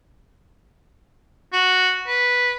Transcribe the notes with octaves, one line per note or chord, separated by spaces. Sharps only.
F#4
B4